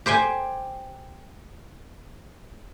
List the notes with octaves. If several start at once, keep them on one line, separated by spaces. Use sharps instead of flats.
G4 C5 G5 G#5